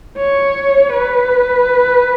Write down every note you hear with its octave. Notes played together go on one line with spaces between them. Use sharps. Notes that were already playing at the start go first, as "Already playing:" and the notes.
C#5
B4